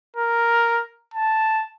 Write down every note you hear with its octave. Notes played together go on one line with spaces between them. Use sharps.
A#4
A5